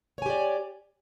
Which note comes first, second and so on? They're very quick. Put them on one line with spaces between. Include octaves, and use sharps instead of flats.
C#5 G#5 G4 D5